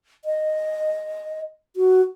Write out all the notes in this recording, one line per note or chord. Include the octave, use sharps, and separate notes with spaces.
D#5
F#4